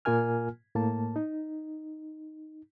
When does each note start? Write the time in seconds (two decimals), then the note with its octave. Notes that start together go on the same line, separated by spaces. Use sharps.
0.05 A#2 A#3 F4 A#4 G#5 F6
0.75 A2 A#3 A5
1.16 D#4